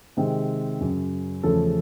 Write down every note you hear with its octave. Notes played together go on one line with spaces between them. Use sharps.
C3 D#3 G#3 C4
F#2 C#3 F#3
E2 C#3 F3 A3 C#4 A4